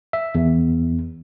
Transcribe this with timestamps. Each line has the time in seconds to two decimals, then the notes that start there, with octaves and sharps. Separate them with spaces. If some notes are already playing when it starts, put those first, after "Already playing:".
0.13 E5
0.35 E2